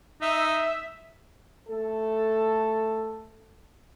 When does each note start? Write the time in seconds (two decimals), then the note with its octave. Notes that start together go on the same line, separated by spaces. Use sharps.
0.22 D#4 E5
1.68 A3 A4